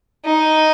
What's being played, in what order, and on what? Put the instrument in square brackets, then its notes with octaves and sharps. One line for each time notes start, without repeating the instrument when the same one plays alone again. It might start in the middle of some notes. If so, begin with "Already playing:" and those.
[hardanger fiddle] D#4